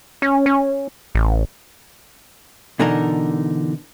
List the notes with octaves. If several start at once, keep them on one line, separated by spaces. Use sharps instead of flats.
C#4
C#4
A1
B2 D3 E3 D4 D#4 A#4